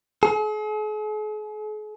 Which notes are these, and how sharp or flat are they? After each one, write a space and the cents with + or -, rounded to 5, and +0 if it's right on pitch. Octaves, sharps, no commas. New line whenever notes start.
G#4 +45